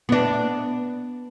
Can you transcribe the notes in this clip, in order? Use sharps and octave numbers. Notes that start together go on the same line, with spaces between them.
B3 D4